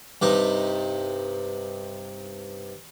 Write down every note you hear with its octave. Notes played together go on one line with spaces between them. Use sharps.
G2 C3 D#4